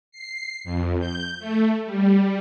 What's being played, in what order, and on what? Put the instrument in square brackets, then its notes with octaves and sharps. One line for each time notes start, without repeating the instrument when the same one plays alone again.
[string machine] C7
F2
G6
A3
G3